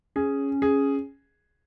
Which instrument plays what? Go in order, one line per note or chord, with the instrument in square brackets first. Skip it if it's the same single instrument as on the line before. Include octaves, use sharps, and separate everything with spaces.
[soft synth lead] C#4 [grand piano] G#4
[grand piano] G#4